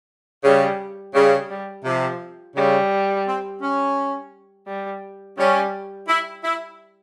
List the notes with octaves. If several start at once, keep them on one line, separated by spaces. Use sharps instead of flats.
C#3 G3
C#3 G3
G3
C3 F3
C#3 G3
C4
C#4
G3
G3 C#4
E4
E4